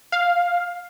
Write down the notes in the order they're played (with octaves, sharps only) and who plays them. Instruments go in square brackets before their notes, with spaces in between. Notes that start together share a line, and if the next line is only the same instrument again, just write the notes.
[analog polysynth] F5